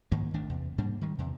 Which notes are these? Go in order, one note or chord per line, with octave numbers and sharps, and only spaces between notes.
G#2 D#3 A#3
G#1 D#3 A3 D4
E2 C3
G#2 G3 A#3 D4
D#3 G3 G#3
E2 C3